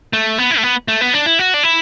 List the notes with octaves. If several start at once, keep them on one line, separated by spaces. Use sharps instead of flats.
A3
B3
E4
A3
B3
A3
B3
D4
E4
F#4
D4
E4